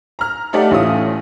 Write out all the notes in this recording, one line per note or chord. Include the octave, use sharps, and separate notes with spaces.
A#5 F6
A3 D#4 G4 D5 F#5 A5
A1 A3 C#4 F4 D#6